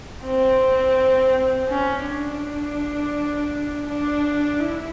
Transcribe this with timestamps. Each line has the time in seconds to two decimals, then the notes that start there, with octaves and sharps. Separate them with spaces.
0.24 C4
1.69 C#4
2.05 D4
3.87 D4
4.60 E4